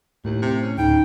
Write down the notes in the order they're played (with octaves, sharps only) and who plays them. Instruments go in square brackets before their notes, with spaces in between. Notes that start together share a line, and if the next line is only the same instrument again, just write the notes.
[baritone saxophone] D#2 [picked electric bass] A2
[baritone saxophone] C3
C#4
[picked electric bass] D1 [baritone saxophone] C#3 [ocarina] D#4 [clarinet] G5